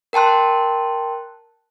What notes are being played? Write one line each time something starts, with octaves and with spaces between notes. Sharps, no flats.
A#4 G5 A5 C6 F#6